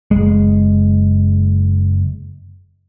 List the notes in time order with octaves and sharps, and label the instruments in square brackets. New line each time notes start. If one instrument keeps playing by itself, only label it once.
[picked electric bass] F#1 D#2 G#3